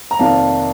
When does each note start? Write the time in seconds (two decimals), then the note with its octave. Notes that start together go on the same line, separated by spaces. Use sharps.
0.11 A#5
0.19 F1 F2 C3 D#3 A#3 F5 A5